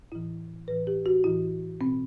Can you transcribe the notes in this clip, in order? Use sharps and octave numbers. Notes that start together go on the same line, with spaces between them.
A2 E3 E4
A2 E3 B4
G4
F#4
A2 E3 E4
B2 C4